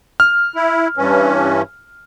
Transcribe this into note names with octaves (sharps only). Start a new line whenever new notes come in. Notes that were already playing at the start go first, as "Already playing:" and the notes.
F6
E4
G2 E3 C#4